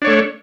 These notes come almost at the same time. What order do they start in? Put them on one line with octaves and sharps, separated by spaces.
D4 C#5 A3